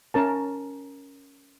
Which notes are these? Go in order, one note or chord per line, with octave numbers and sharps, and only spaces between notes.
C#4 A#4 A5